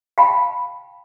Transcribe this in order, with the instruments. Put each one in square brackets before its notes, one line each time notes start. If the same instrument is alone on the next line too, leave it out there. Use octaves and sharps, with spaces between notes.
[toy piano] F5 G5 A5 B5